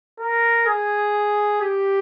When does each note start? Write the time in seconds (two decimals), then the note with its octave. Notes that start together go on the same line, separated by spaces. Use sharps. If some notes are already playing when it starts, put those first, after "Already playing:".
0.19 A#4
0.67 G#4
1.61 G4